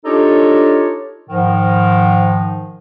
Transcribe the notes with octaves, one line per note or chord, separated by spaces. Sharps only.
D4 D#4 F4 G4 A4 C#5
G#2 D#3 F3